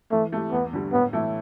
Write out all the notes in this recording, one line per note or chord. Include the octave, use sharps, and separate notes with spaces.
E3 A3
A3 E4 G4
E2 B3
D3 G3
A2 B3
E3 A3 E4